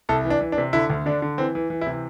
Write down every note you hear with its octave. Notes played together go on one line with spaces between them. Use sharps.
C2 A4
E3
D4
E3
D4
C3
D3 E4
D2
D3 D4
D3
E3 C4
E3
E3
E4
C3